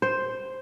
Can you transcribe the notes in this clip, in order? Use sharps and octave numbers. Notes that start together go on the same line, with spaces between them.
C5